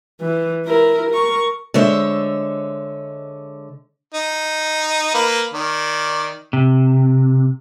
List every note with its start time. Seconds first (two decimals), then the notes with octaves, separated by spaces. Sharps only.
0.21 E3
0.65 E4 A#4
1.11 A#4 C#6
1.74 D3 G#3 C5 C#5 E5
4.14 D#4
5.14 A#3 B4
5.54 D#3 D5
6.53 C3